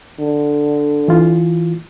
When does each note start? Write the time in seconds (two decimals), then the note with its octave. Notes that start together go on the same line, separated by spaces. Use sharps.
0.20 D3
1.08 E3 F4